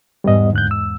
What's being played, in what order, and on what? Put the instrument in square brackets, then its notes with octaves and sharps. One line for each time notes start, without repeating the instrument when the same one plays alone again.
[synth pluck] E2 G#2 [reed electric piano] G3 B3 D#5
[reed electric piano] D2 F#6 G6
E6